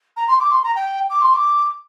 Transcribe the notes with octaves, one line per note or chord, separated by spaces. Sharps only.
A#5
C6
D6
C6
A#5
G5
D6
C6
D6